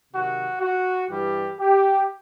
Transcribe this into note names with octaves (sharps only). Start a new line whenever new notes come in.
C3 D#3 F#3 F#4
F#4
G2 E3 G3 G4
G4